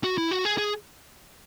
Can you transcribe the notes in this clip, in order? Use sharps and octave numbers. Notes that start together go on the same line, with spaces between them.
F#4
E4
F#4
G#4
G#4